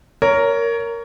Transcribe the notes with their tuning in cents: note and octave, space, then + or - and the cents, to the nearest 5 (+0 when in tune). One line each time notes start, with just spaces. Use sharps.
A#4 -5 C#5 +20